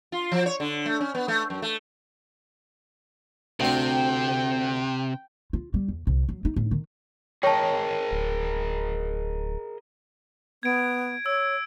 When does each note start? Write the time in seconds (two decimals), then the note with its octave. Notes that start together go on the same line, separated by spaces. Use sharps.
0.12 F4
0.32 F3
0.46 C#5
0.60 D3
0.86 A3
1.01 C#4
1.15 B3
1.28 A3
1.50 F#2
1.62 A3
3.60 D2 C3 C4 G5
5.53 F4
5.74 G3
5.88 E2
6.07 C2
6.29 F#3
6.45 D#4
6.56 A2
6.71 D#3
7.43 G#4 A#4 C#5 D#5 G5 A5 C#6
8.11 D1
10.63 B3 G#6 D7
11.26 C#5 E6